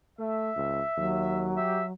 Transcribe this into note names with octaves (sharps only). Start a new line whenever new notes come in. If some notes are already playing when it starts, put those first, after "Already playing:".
A3 E5
C#2
D#2 F#3
G4 E5